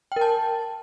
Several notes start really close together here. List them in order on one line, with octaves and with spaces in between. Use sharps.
G5 A#4 A5